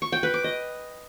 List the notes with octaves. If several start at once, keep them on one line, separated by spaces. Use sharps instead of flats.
C#6
G5
B4
D6
D#5